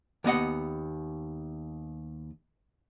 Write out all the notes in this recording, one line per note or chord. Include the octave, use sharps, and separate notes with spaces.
D#2 B3 D#5 F#5